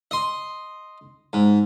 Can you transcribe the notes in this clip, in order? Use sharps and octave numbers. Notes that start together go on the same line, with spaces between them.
D#5 C6
G#2